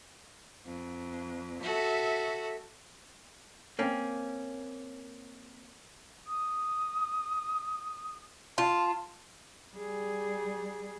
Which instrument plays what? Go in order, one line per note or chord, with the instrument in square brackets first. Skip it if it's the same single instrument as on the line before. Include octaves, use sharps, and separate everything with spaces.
[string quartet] F2
[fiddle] F#4 A4 [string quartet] E5
[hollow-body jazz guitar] A#3 C4 C#4
[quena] D#6
[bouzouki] F4 [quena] A5
[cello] G3 G#4